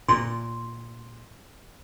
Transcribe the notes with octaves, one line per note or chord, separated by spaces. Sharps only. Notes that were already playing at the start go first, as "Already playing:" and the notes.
A#2 C6